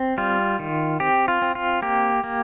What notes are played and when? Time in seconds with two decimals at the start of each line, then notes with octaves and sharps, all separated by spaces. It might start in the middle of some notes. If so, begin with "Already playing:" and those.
Already playing: C4
0.18 G3 F4
0.59 D#3
1.00 C4 G4
1.28 F4
1.42 C4
1.55 F4
1.82 A#3 G4
2.24 A#3